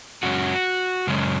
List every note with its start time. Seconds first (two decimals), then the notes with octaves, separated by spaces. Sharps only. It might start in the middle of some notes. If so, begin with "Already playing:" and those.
0.23 F#2 C#3 G#3 C#4 F#4
1.07 F#2 C#3 G#3 C#4